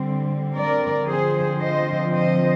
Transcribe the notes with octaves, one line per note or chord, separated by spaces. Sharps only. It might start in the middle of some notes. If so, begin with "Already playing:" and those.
Already playing: D3 G3 C4
A#4 D5
D3 F3 C4 G#4 C5
C5 D#5
C5 D#5